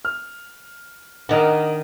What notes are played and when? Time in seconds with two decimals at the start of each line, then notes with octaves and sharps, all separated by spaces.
0.05 F6
1.29 D#3 D4 A#4 D#5 F#5